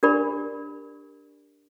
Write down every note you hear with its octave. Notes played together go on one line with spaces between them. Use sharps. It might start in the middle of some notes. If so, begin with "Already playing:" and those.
D4 G4 A#4 D5 B5